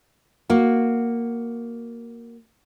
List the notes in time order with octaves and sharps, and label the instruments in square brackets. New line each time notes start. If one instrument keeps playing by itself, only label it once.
[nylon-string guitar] A#3 F#4